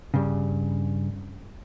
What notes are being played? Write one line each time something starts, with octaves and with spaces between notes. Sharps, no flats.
G2 C#3